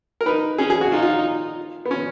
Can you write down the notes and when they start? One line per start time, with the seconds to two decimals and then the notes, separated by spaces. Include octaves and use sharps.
0.21 A#4
0.26 D#4 B4
0.58 C#4 G#4
0.70 G#4
0.81 F#4
0.92 D#4 F4
1.02 F4
1.85 B3
1.91 C#4